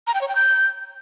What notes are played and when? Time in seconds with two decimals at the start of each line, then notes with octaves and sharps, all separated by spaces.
0.07 A#5
0.14 G5
0.21 C#5
0.28 G5
0.35 G6